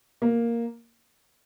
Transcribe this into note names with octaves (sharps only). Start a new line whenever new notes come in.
A#3